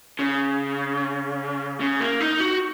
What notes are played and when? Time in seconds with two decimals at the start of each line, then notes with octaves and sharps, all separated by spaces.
0.19 C#3
1.80 C#3
2.00 A#3
2.21 D#4
2.40 F#4